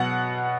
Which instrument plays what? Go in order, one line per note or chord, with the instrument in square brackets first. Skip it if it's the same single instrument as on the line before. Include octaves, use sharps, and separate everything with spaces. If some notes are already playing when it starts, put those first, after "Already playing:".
Already playing: [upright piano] B2 F#3 B3 F#5